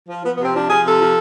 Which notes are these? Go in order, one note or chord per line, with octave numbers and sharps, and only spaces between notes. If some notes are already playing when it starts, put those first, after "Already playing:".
F3
F3 B3
B3
C3 C4
F3 D4
F3 G#4
C3 A4
F3